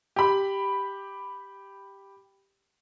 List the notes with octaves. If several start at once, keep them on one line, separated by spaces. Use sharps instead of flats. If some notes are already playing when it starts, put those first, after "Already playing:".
G4 B5